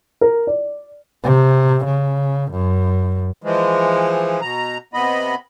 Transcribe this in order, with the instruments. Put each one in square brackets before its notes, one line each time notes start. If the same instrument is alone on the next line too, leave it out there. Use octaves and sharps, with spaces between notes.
[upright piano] A#4
D5
[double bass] C3
C#3
F#2
[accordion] E3 F3 G#3
B2 A#5
C3 B3 D#5 B5